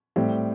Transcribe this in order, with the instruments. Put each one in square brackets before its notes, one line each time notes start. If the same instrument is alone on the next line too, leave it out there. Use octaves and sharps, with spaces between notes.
[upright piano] A2 G3 C4 G4